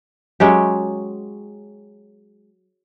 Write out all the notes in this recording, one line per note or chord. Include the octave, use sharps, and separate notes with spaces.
F#3 G#3 C#4 G4